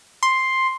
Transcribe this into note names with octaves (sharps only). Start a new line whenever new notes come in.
C6